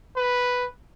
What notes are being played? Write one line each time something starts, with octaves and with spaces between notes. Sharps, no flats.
B4